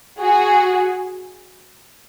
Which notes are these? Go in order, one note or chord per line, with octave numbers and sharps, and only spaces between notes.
F#4 G#4